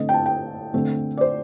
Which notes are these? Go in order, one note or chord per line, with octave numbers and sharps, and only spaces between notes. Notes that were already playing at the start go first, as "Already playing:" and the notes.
Already playing: D3 A3 C4 D#5
G5
A5
G5
D3 A3 C4
D5
C5